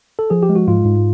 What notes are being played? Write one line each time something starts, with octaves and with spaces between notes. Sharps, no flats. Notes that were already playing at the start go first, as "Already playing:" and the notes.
A4
F3 G#4
G4
G#3
F#4
G#2 F4
G#2